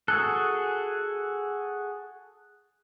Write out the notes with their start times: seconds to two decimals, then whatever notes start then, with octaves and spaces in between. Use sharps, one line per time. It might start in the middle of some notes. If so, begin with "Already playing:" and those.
0.08 F#4 G#4 A4 F#6